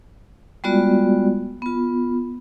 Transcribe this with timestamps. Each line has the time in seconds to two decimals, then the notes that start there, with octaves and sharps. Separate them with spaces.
0.64 G3 G#3 B3 F4 F#4 D5
1.62 B3 F4